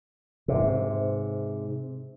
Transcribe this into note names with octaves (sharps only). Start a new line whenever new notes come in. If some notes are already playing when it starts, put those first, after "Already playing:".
G#2 C3